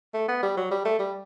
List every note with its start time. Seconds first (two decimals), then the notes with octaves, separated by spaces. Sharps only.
0.14 A3
0.28 B3
0.42 G3
0.57 F#3
0.71 G3
0.85 A3
0.99 G3